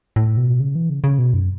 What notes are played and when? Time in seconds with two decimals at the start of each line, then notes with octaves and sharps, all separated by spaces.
0.16 A2
0.37 B2
0.60 C#3
0.75 E3
0.90 C#3
1.04 C#3
1.18 B2
1.33 F#2